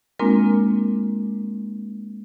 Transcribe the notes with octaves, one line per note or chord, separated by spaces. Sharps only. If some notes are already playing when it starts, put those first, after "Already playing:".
G#3 A#3 C4 D4 F4 A#4